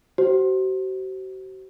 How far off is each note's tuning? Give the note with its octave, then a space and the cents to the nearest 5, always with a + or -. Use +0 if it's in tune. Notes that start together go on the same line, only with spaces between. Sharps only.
F#4 +45 C5 +0